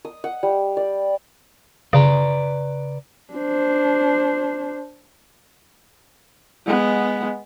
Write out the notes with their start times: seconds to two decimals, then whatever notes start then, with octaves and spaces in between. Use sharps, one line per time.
0.05 D#6
0.24 F#5
0.43 G3
0.77 D5
1.93 C#3 B4 D5 A#5
3.34 D4 C5
6.66 G#3 B3